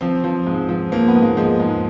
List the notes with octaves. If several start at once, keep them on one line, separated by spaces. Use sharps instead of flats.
F3 C4
F3
G#2
F3
F3 A#3
B3
G#2
A#3
F3 G#3
G#2